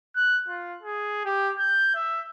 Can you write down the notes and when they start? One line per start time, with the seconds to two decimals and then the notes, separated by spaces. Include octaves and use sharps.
0.16 F#6
0.48 F4
0.83 G#4
1.25 G4
1.59 G6
1.95 E5